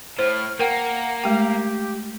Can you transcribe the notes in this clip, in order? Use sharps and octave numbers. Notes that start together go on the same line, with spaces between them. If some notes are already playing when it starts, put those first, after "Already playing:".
A2 C5 F6
A#3 A#4 F#5 G5
G#3 A3 G4 G5